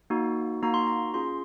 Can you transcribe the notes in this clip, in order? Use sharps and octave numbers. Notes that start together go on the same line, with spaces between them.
A#3 D#4 F#4
A#3 D#4 F#4 A#5
C6
A#5
C#4 F4 G#4 C6